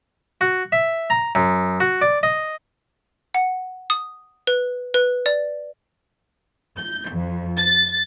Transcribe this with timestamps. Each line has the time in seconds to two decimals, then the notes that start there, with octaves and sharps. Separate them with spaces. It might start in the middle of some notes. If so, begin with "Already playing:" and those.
0.41 F#4
0.72 E5
1.10 A#5
1.35 F#2
1.80 F#4
2.01 D5
2.23 D#5
3.34 F#5
3.90 D#6
4.47 B4
4.94 B4
5.26 D5
6.77 G6
7.08 F2
7.57 A6